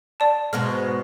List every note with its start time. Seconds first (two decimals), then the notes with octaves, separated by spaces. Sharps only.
0.20 D5 A5
0.53 G#2 B2 G#3 F6